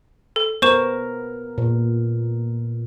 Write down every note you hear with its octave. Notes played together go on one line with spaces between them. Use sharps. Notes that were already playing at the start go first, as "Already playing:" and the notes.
A4
B3 A#4 C5 C#6 E7
A#2